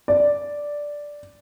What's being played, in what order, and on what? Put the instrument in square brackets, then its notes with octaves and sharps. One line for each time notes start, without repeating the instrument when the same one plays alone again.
[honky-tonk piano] D5